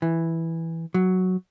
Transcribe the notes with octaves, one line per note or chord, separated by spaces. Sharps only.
E3
F#3